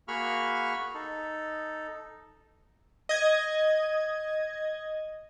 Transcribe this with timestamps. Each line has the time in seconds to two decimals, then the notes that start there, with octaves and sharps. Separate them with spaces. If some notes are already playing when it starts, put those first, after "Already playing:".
0.08 A#3 F#4 G#4 B5 C#6 F6
0.94 D#4 A4
3.09 D#5 G#6